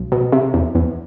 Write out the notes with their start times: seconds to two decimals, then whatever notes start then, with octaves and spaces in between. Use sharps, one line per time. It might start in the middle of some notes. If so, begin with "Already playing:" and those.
Already playing: B1
0.12 B2
0.32 C3
0.54 E2
0.75 E2